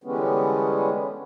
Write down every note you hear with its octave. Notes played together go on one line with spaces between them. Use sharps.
D3 E3 G3 G#3 B3 C#4